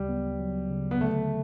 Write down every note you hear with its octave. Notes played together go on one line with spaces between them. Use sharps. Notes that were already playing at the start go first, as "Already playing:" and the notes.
Already playing: D2 C#3 F#3 G3
B3
F#3
C#3
B3
D3 A3